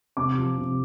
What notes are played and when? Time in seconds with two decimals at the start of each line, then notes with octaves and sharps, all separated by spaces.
0.17 C3 D6
0.38 F3
0.58 C3